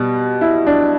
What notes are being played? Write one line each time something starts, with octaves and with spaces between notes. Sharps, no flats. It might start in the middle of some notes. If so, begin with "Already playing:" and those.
Already playing: B2 G3
E4
D4